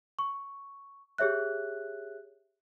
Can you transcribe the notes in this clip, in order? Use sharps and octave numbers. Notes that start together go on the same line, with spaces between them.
C#6
G4 G#4 C#5 E5 F#6